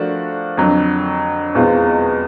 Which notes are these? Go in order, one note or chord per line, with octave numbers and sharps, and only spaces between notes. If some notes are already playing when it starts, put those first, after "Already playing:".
Already playing: F3 A3 D4 F#4 A#4
F2 D3 F#3
E2 B2 G#3 C4 F4